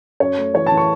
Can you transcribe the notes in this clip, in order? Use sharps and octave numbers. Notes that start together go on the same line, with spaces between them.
F#2 C#5
A3
E3 C#5
A5
E3
C#6